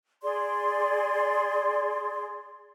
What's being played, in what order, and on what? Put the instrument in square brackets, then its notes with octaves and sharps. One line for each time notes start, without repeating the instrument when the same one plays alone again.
[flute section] G#4 D5 C6